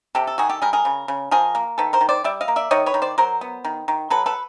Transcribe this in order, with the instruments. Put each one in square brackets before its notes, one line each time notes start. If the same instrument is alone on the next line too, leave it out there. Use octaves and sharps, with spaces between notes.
[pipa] C3 G4 A4
A4
D#3 F#4 G#4
G4 A4
G3 G#4 A#4
G#4 A#4
C#3
C#3
F3 G#4 A#4
A#3
D#3 A4 B4
A#4 C5
D#3
C5 D5
G3 D5 E5
D#5 F5
A#3
D5 E5
D#3 C#5 D#5
B4 C#5
D#3
C5 D5
F#3 A#4 C5
B3
D#3
D#3
F#3 A4 B4
A4 B4